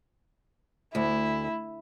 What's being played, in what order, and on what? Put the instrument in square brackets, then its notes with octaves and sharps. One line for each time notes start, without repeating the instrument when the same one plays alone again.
[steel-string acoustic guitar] D2 [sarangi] E4